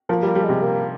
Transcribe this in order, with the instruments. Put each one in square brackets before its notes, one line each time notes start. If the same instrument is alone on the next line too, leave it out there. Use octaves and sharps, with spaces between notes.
[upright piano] F3 [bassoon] A#3
[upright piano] G3
[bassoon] A#3
[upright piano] G3
[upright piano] C3 [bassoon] G#3
[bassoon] A#3